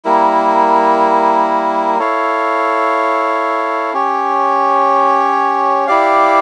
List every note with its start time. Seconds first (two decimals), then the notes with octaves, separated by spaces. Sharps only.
0.05 G3 A#3 E4 A#4
1.99 E4 A4 C#5 F5
3.93 C#4 G4 C#5
5.87 E4 G4 D5 F5